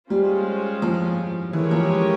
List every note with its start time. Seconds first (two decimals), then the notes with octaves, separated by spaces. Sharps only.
0.10 G3 G#3 C#4 F4 C5
0.82 F3
1.53 E3 G#3 C#4 G4 A#4 C#5
1.71 F3